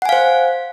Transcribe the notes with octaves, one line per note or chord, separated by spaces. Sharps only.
C5 F5 F#5 G#5